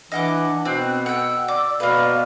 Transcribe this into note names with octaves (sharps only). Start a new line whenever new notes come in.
E3 D4 D#5 F#5 D6
B2 C4 F#6
F#5 G5 E6
D5 D6
B2 A#3 B4 D5 F5